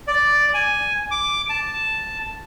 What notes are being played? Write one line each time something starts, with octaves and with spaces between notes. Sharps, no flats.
D5
G#5
D6
A5